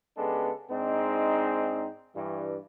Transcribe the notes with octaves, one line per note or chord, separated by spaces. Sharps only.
C#3 G#3 B3 D4 G4 A4
G#2 G#3 C4 D4 D#4
G2 E3